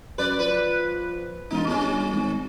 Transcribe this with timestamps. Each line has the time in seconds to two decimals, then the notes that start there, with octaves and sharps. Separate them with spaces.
0.18 F#2 B4 D5
0.39 F3 B4
1.51 E1 D#4 F4
1.67 G1 G3 C#4
2.13 G#1